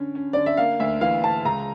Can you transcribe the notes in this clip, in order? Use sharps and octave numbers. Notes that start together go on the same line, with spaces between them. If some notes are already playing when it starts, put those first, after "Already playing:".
Already playing: D3 C#4
C#4
D3 D5
E5
A#3 F5
D2 E5
E3 F5
D2 A5
C#2 A#5